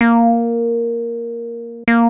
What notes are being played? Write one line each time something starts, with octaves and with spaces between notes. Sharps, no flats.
A#3
A#3